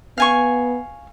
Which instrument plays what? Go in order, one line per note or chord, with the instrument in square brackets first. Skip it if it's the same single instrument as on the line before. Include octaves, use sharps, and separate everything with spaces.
[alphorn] B3 [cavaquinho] F5 G#5 C#6